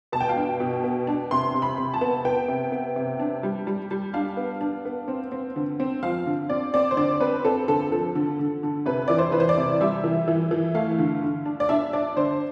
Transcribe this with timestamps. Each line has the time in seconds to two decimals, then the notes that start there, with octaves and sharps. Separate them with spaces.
0.12 B2 A5
0.21 G5
0.29 F5
0.36 D4 G5
0.60 B2
0.84 B3
1.07 D4
1.31 C3 C6
1.54 C3
1.62 B5
1.78 C3
1.94 A5
2.01 B3
2.25 B3 G5
2.48 C3
2.72 B3
2.96 C3
3.20 D4
3.43 G3
3.67 G3
3.91 G3
4.14 D4 F5
4.37 B3
4.61 D4
4.85 B3
5.08 C4
5.32 C4
5.56 D3
5.80 C4
6.03 F3 F5
6.26 D3
6.49 C4 D5
6.74 C4 D5
6.91 C5
6.97 D3 D5
7.20 C4 B4
7.44 C4 A4
7.68 D3 A4
7.92 F3 A4
8.15 D3
8.39 D3
8.63 D3
8.86 C3 B4
9.08 E3 D5
9.18 C5
9.32 E3 B4
9.40 C5
9.49 D5
9.57 C3
9.81 G3 E5
10.04 E3
10.28 E3
10.51 E3
10.75 A3 F5
10.99 D3
11.22 D3
11.46 D4
11.60 D5
11.69 D4 E5
11.93 D4 D5
12.17 D3 C5